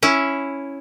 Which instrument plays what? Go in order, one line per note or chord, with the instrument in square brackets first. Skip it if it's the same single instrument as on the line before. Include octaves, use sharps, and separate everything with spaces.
[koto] C#4 E4